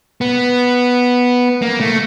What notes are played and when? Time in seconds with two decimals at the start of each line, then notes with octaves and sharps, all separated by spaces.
0.21 B3
1.62 A#3
1.80 A3